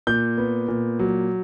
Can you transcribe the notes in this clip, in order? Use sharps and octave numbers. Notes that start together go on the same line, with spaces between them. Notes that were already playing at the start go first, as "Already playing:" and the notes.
A#2 G6
B3
A#2
F#3